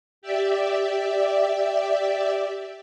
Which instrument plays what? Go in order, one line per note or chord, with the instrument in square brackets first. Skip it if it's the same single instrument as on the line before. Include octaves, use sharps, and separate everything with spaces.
[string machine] G4 D5 E5